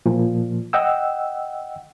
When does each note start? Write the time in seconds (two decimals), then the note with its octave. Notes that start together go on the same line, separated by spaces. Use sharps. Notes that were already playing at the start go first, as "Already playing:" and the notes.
0.06 A#2 F3
0.73 D#5 F#5 G5 E6